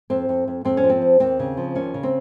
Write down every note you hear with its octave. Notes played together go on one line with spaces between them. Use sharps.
F2 C4
F2
F2
F2 C4
C#4
F3
C4
F2
D#2 C4
C#3
F3
D#2 C#4
C#3
C4